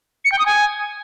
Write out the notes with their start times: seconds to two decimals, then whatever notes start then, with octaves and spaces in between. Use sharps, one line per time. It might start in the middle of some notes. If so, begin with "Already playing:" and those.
0.25 C#7
0.32 G5
0.39 D#6
0.46 G#5